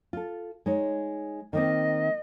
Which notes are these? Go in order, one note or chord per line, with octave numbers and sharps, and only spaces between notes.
F4 A4
G#3 D#4 C#5
D#3 A#3 C4 D#5